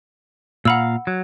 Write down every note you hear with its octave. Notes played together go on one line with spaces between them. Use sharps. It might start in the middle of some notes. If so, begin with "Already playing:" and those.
A#2 F5 F#5 A#5 B5 E6
F#3